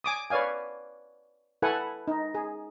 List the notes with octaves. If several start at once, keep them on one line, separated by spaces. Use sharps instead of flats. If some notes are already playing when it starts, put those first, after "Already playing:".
G#5 D6 D#6
B4 C#5 D5 F5 G#5
E4 A4 B4 F#5 G#5
D#4
G#4